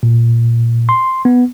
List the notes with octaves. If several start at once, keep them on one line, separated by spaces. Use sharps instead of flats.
A#2
C6
B3